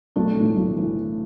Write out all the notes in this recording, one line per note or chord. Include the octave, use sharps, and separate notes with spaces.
B1 A3 D4
A2
E3
B1
E3